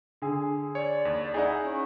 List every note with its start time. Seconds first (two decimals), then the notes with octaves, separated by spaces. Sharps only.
0.22 D3 G#4
0.75 C#5 D5
1.05 D#2
1.34 D#4 E4 G#4 F#5
1.62 C#4